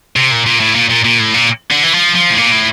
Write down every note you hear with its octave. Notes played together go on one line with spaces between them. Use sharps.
C3
A#2
A#2
A2
A#2
A#2
A#2
A2
A#2
D3
E3
F3
F3
A2
A#2
A2